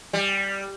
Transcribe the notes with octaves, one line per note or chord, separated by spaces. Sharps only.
G3